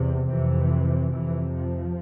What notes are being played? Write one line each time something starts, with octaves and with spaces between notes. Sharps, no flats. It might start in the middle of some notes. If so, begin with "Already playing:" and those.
Already playing: E2 C3
F2 C3 E3
F2 C3 E3
F3